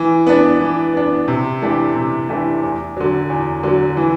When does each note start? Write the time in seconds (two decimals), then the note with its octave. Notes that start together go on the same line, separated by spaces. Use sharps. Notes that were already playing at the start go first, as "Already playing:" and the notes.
Already playing: E3
0.27 B3 D4
0.61 E3
0.94 B3 D4
1.28 C3
1.62 E3 A3 D4 G4
1.95 C3
2.29 E3 A3 D4 G4
2.63 E2
2.97 D3 F#3
3.30 E2
3.63 D3 F#3
3.97 E3